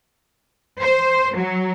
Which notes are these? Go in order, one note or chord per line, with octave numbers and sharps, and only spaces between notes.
C5
F#3